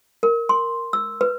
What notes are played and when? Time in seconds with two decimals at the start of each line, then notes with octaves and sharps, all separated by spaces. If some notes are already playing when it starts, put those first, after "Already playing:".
0.23 A#4
0.49 C6
0.93 E6
1.21 B4